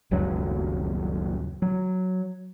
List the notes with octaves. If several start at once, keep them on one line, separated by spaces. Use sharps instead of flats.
D#1 C#2 F#2 F#3
F#3